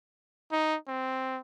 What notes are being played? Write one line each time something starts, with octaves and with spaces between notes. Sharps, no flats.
D#4
C4